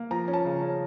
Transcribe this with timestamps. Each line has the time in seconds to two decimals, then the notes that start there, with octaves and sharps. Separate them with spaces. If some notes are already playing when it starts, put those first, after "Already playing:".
Already playing: A#3
0.11 F3 A#5
0.28 C#4
0.33 A5
0.45 C#3
0.62 C#4